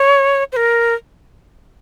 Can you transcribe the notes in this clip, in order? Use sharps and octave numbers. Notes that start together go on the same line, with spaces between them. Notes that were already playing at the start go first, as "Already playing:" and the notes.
Already playing: C#5
C5
A#4